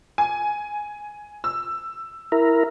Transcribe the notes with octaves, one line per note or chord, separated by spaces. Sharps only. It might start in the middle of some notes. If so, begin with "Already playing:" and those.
G#5
E6
E4 A#4